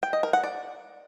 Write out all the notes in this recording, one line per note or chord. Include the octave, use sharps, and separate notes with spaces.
G5
D#5
A#4
F#5
D5